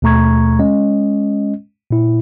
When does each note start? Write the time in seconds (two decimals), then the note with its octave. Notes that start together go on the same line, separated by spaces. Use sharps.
0.02 D#2 B2 A3 A#5 C#6 G#6
0.59 G#3 C#4 D#5
1.91 A#2 E4